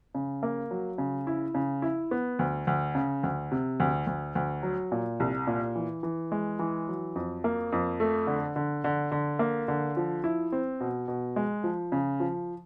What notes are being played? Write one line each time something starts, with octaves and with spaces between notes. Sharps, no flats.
C#3
A#3
F#3
C#3
E4
C#3
E4
B3
D2
D2
C#3
D2
C3
D2
D2
D2
F#3
A#2
C2
A#2
E3
E3
G#3
E3
F#3
F2
A#3
F2
A3
D3
D3
D3
D3
A#3
D3
F3
E4
C4
B2
B2
G#3
F3
C#3
F3